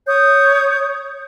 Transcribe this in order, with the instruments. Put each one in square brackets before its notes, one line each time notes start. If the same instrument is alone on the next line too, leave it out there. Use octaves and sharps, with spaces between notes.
[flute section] C#5 D#6 G6